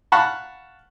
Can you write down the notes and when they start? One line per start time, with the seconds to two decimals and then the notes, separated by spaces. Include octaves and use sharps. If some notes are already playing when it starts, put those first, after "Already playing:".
0.12 F5 F#5 A5 B5 C#6